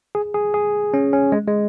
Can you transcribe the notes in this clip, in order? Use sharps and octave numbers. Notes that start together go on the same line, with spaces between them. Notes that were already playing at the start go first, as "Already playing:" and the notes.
G#4
G#4
G#4
C#4
C#4
G#3
G#3